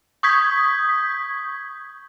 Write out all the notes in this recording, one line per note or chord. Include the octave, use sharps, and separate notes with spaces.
C#6 D#6 G6 G#6 B6